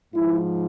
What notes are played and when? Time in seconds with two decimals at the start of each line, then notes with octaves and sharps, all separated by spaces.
0.15 G#2 F3 E4